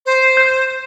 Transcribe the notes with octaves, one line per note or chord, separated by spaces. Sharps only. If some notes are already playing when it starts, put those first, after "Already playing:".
C5
G6